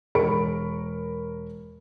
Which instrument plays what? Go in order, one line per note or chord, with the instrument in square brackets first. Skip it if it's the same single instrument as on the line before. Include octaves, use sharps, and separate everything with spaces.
[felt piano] E1 A#4 B5 C#6 C#7 D7